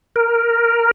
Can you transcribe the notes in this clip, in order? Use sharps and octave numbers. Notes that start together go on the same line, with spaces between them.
A#4